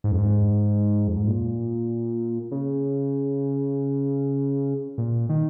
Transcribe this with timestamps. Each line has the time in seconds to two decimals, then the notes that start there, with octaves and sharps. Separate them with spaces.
0.04 G#2
0.12 F2
0.18 G#2
1.08 F2
1.17 G#2
1.27 A#2
2.51 C#3
4.98 A#2
5.29 D#3